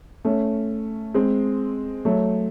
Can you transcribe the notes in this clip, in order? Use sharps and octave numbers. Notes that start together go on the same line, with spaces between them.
A3 C#4
G#3 C4
F#3 A3